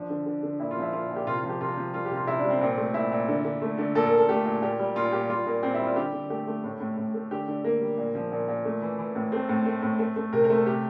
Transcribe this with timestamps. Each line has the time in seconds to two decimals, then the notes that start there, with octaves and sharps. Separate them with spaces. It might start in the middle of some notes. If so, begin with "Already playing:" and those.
Already playing: F3 D4
0.10 D3
0.26 D3
0.43 D3
0.60 A#2 E4
0.71 F4
0.77 F3 E4
0.93 A#2 F4
1.11 A#2
1.16 G4
1.27 C3 F4
1.38 F4
1.43 F3
1.49 G4
1.61 C3 F4
1.77 F3
1.94 G3 F4
2.05 G4
2.11 C3
2.16 F4
2.27 C3 E4
2.39 D4
2.44 G3
2.50 C4
2.61 A#2 C4
2.77 A3
2.94 A#2 E4
3.12 A#2
3.28 D3
3.45 D3
3.62 A3
3.78 D3
3.95 A#2 A4
4.06 A#4
4.12 A#2
4.17 A4
4.29 A3 G4
4.45 A#2
4.62 A#2 G4
4.79 G3
4.96 A#2 F4
5.12 A#2 G4
5.30 G3 F4
5.46 A#2 A#3
5.63 A#2 C4
5.74 E4
5.80 G3
5.85 F4
5.96 D3 G4
6.13 D3
6.30 A3 G4
6.47 A3
6.64 A2
6.80 A2
6.97 A2
7.14 A3
7.31 D3 G4
7.48 D3
7.64 D3 A#3
7.81 G3
7.98 A#2
8.15 F3
8.32 A#2
8.48 A#2
8.65 A3
8.82 E3
8.99 E3
9.15 A2
9.32 A3 C4
9.49 A2
9.65 A3
9.83 A2
9.99 A3
10.16 A3
10.33 C3 A#4
10.44 A#4
10.50 A3
10.55 A4
10.66 C3 G4